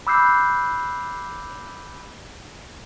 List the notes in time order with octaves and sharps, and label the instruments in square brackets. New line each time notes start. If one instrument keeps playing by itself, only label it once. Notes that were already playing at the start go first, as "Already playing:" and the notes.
[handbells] B5 D6 E6 F#6 G6 C7